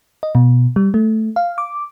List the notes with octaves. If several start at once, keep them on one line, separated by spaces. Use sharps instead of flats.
D#5
B2
G3
A3
F5
D6